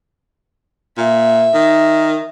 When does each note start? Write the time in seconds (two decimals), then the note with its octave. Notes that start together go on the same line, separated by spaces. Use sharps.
0.98 A#2 E5
1.54 D#3